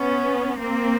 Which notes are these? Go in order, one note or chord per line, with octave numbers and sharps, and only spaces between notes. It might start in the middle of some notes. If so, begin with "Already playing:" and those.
Already playing: B3 C#4
A#3 C4